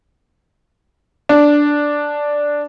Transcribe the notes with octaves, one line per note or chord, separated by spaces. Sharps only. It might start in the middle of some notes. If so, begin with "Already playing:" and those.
D4